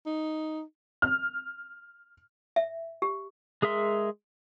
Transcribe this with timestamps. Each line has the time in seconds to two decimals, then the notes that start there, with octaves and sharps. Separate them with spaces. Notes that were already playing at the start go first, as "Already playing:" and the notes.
0.06 D#4
1.02 F6
2.56 E5
3.02 G4
3.62 G#3 G#4 A#4 E5 C6